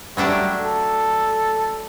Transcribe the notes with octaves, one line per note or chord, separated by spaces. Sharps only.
F#3 G3 A3 D4
A4